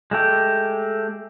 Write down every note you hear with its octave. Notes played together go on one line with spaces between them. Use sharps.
G#3 A3 G4